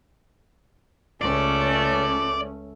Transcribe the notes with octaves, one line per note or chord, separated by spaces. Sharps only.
C#2 A3 C#4 D5